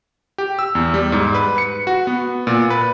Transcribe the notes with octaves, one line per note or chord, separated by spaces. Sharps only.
G4
E6
E2
G3
G#2
B4
C#7
F#4
B3
A#2
B4